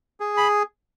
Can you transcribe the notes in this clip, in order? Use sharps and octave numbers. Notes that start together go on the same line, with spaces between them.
G#4
B5